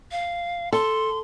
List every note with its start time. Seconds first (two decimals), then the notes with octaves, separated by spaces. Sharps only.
0.11 F5
0.73 A4 C6